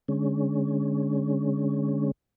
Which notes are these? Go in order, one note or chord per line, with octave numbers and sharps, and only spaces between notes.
D3 G#3 C#4